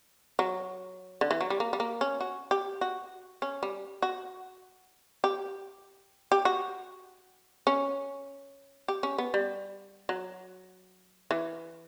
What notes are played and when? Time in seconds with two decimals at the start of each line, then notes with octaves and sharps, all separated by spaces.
0.39 F#3
1.21 D3
1.31 E3
1.41 F#3
1.50 G3
1.60 A#3
1.73 G3
1.80 A#3
2.01 C#4
2.21 F#4
2.51 G4
2.81 F#4
3.42 C#4
3.63 G3
4.02 F#4
5.24 G4
6.32 G4
6.45 F#4
7.67 C#4
8.88 G4
9.03 C#4
9.18 B3
9.34 G3
10.09 F#3
11.31 E3